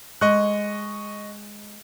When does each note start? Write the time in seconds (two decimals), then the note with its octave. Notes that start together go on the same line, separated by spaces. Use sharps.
0.21 G#3 D#5 C#6 F#6